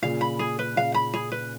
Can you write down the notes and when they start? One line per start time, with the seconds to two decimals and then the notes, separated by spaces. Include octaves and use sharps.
0.02 A#2 C#3 F5
0.21 B5
0.39 G#4
0.59 B4
0.76 A#2 C#3 F5
0.94 B5
1.14 G#4
1.32 B4